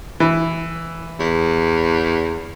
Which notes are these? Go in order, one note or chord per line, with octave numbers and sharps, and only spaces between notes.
E3
E2